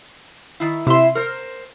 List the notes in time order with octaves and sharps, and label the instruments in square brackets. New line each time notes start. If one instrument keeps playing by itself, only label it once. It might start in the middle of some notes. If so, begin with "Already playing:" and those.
[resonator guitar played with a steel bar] D#3 E4
[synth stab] C3 C6 [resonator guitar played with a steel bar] E4 E5
[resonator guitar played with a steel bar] A#4 C5